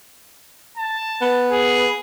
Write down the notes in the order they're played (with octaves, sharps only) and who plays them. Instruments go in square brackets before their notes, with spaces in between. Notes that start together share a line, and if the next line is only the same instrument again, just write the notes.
[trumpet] A5
[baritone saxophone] B3
[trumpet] G#4